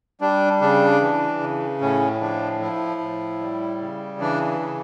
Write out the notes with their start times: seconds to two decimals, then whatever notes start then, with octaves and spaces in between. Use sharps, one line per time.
0.21 G3 D4
0.61 C#3 D4
1.01 E3
1.41 C#3
1.81 A2 C#4
2.20 F3 D4
2.60 F3 E4
3.01 A2
3.41 G3
3.80 C#3
4.20 E3 D4
4.60 C#3